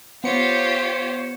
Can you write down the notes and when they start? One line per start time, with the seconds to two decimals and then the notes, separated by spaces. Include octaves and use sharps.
0.24 B3 F4 G4 C5 C#5 C#7